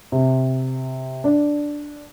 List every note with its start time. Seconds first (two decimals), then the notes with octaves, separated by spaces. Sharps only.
0.12 C3
1.24 D4